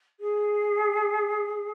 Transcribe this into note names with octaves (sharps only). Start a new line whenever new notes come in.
G#4